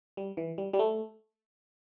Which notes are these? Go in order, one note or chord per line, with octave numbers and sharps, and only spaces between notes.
G3
E3
G3
G3
A3